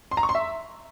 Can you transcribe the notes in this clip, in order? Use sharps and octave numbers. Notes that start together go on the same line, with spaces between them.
C6
A#5
C#6
C6
E5